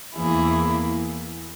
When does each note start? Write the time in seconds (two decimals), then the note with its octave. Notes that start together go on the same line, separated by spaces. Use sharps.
0.15 E2 E3 A#3 E4 G#4